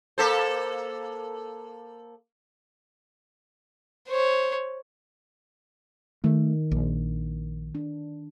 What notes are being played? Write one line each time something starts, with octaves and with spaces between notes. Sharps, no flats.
A#3 A4 C5
C5 C#5
D#3 A3
A#1
D4